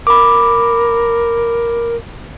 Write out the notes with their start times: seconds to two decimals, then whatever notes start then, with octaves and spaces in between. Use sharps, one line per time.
0.07 A#4 B5 D6